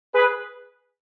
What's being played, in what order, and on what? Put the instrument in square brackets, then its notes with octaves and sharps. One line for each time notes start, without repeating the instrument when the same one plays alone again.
[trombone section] G#4 B4